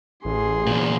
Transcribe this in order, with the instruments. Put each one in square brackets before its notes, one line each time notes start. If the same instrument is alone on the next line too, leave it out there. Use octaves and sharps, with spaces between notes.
[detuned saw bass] A1 [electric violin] G#4 C6
[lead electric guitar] E2 A#2